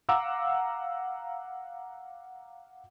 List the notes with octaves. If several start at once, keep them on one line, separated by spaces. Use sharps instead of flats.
F5 F#5 A#5 D6 E6